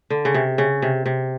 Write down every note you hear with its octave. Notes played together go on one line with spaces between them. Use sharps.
D3
C#3
C3
C#3
C3
C3